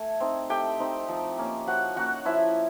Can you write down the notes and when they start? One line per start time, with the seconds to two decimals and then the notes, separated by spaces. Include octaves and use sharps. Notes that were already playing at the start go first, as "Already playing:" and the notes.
Already playing: A3 G#5
0.20 C4 D#4
0.50 A3 G4 G5
0.80 C4 D#4
1.08 F3
1.39 A#3 C#4
1.67 F3 F#4 F#5
1.96 A#3 C#4 F#4 F#5
2.25 F3 E4 E5